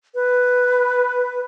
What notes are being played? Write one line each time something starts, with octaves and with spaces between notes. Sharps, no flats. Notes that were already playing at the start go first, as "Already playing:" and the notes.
B4